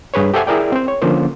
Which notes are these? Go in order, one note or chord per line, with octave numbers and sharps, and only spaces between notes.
G2 G#4 B4 C#5
G4 A4 C5 E5 F#5 G#5
E4 G#4 A#4 D5 G5
C4 C5
C#5
D3 F3 A#3 C#4 C5